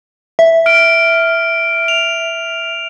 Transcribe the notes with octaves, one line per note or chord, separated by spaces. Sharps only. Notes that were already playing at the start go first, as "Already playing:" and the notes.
E5
F6 D7
F7